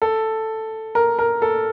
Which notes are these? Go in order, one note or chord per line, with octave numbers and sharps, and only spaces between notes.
A4
A#4
A#4
A4